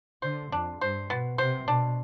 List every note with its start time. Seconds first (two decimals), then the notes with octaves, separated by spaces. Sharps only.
0.22 D3 C5
0.52 F2 D4
0.81 G2 C5
1.10 B2 B3
1.38 C3 C5
1.68 B2 D4